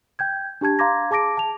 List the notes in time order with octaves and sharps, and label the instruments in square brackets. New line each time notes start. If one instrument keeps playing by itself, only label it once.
[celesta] G5 G6 G#6
D4 G4 A5 G#6
F5 A#5 C6 D6 G#6 A#6
G#4 A5 D6 A#6 D7
A5 F7